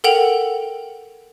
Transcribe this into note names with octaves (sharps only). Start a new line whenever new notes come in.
A4 A#4 F#5 G5 F7 F#7